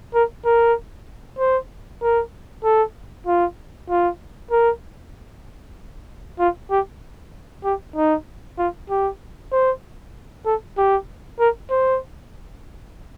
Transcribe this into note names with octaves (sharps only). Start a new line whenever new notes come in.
A#4
A#4
C5
A#4
A4
F4
F4
A#4
F4
G4
G4
D#4
F4
G4
C5
A4
G4
A#4
C5